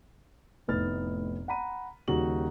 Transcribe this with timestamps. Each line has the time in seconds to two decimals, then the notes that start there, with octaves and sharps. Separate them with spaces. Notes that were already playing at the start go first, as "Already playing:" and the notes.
0.68 F1 A2 B3 D#4 F6 A6
1.48 F#5 A#5 B5 D#7
2.08 D#2 C#3 G3 F#4 F#7